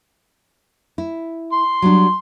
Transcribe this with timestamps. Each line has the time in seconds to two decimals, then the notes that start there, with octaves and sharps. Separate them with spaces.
0.98 E4
1.52 C6
1.82 F#3 G3 D4